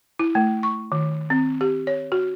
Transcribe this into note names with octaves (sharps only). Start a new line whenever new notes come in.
E4
A3
C#6
D#3
C4
G4
C#5
F#4